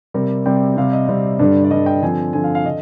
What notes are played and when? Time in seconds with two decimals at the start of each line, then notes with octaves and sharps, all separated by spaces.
0.14 C3 G3 C4 A#4
0.46 C3 G3 C4 G5
0.77 C3 G3 C4 F5
0.93 D#5
1.09 C3 G3 C4 D#5
1.39 G2 D3 G3 D5
1.64 D5
1.71 G2 D3 G3 D#5
1.86 G5
2.02 D3 F3 C4 G#5
2.33 D3 F3 C4 G#5
2.44 F5
2.55 F5
2.66 D3 D#5